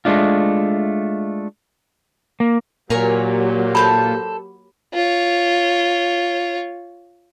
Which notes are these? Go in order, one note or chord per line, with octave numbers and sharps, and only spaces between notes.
G#3 A3 D4 F4
A#3
A#2 F#3 A#3 G4 A#4 C#5 G#5
A4 C5 A5 B5
F4 C#5